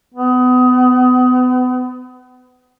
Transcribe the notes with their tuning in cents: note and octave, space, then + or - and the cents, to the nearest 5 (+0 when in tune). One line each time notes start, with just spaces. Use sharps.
B3 +30